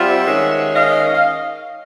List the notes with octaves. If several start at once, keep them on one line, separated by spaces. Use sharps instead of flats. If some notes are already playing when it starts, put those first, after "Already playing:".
Already playing: G3 C4 F4 E5 F#5
D#3 G#3 C#4
D#5 F5
F5